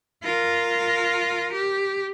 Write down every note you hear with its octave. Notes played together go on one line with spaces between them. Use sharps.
F4 A#4
G4